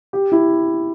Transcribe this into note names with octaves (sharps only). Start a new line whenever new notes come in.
G4
E4